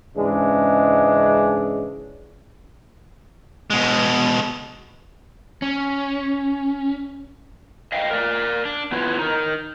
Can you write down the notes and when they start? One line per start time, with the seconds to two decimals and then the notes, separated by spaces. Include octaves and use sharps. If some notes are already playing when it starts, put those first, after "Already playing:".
0.17 G#2 C#3 E3 G#3 C#4 D4
3.70 B2 G#3
5.62 C#4
7.92 D#5 F5 G5
8.11 A#4 D5
8.65 D4
8.92 B3 E4 F4 B4 C#5
9.19 D#4 A#4